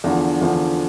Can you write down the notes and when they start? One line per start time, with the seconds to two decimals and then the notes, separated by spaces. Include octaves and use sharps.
0.04 E2 D3 F3
0.41 E2 D3 F3